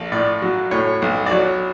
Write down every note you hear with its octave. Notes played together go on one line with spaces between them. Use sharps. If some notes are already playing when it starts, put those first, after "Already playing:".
Already playing: A#1
A2 D5
F#3
A2 C#5
B1
D5
F#3 C#5